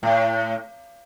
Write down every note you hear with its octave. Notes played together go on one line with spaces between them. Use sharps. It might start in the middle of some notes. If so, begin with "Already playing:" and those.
A2